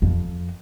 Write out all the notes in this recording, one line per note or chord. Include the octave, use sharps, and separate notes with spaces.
F2